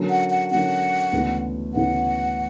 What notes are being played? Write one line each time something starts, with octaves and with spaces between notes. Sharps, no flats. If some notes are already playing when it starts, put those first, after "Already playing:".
Already playing: D3 F#3 A#3 C#4
F#5
F#5
D3 F#3 A#3 C#4 F#5
D2 C#3 E3 B3
D2 C#3 E3 B3 F#5